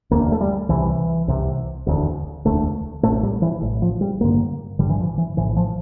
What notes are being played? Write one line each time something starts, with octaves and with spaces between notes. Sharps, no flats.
E1 D2 D3 A#3
A3
G3
C2 C3 E3
C2 C3
E1 D2 D3
E1 D2 D3 A3
A1 A2 A3
G3
E3
A1 A2
F3
G3
A1 G2 D3 A#3
A1 G2 D3 G3
E3
F3
E3
A#1 A2 E3
F3